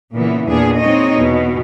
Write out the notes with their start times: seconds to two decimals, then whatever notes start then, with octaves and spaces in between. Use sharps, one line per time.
0.15 A#2 C#3 E3 A#3 B3
0.49 E2 A#2 B3 D4 G#4
0.78 G#3 C4 D#4 C#5 D#5
1.16 E2 B2